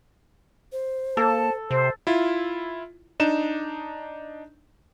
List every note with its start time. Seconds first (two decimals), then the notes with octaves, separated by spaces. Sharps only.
0.72 C5
1.17 A#3 A4 A5
1.71 C3 C5
2.07 E4 F4
3.20 D4 D#4 E7